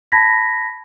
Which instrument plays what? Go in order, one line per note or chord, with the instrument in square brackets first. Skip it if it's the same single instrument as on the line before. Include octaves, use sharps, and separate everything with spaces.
[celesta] A5 B5 G#6 A#6 B6